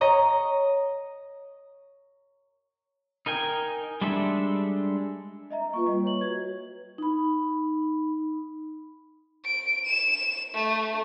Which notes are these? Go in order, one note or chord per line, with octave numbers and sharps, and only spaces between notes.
C#5 D#5 A#5
D#4 A#4 G5 G#5
G3 G#3 D4 A4 E5
D#5 E5 A#5
A#3 F4 B4 C#6
G3 D#5
C#5 F#7
F#4 B4 G#6
D#4 B5
D7
E7
A3